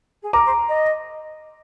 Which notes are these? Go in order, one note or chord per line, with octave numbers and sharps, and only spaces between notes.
G#4
A#4 A#5 D6
C5
D#5